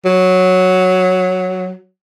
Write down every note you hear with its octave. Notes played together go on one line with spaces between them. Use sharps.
F#3